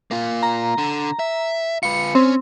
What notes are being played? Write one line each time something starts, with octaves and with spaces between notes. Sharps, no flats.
A#3 F4
A#5
D3
E5
F4 B4 C#7
C4 C#4